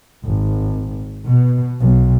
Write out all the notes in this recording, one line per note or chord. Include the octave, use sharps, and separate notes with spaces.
G#1
B2
B1